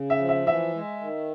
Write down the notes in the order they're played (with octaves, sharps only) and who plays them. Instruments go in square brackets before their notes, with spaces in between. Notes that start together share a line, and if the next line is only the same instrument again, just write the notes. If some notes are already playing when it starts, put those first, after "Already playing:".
Already playing: [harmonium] C#3
[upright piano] E5
[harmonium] F3
[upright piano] E5
[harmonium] E3 [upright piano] E5
[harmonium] G#3
D#3